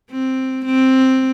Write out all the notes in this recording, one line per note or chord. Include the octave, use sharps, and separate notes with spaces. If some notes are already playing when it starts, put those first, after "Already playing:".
C4
C4